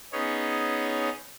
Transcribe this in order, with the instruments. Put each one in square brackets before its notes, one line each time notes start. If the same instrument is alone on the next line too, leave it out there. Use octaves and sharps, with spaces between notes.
[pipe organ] B3 C#4 D#4 G#4 C#5